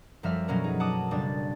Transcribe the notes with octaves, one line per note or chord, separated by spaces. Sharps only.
F#2 F3 G3 E5 F6
B2 F#3 A#3 C#4 A#4 B4
D#4 G#4
F#5 A5 D6 D#6
F#1 G3 D4 D5 A6